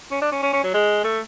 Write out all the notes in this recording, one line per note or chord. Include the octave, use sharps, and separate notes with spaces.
C#4
D4
C#4
C#4
C#4
F#3
G#3
A3